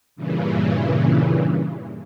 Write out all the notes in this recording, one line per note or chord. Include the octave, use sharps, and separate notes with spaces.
G2 A#2 C#3 E3